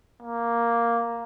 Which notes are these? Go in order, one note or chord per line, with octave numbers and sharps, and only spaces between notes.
A#3